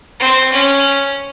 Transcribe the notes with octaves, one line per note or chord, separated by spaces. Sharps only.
C4
C#4